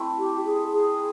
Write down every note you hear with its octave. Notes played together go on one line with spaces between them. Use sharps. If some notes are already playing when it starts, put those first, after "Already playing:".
Already playing: A3 C4 E4
G4
G#4
G#4